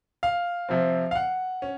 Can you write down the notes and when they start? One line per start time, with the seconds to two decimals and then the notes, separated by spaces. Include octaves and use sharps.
0.23 F5
0.69 C3 F3 C4
1.11 F5
1.15 F#5
1.62 C#4